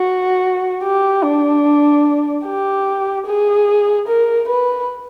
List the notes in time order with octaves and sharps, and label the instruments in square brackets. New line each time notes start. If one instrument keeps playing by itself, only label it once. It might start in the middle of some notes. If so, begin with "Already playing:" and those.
Already playing: [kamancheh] F#4
G4
D4
G4
G#4
A#4
B4